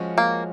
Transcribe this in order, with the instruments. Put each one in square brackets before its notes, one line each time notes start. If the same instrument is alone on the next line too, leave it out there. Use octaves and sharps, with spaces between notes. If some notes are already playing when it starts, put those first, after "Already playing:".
Already playing: [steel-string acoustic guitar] F3 G#3 C#4 F#4
[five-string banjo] A#3